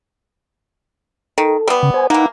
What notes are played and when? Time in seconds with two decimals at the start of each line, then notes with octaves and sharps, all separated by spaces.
1.38 D#3 A4
1.68 G3 B3
1.83 C#3
1.94 C5 G#5
2.10 E3 A#3 D#4 F#5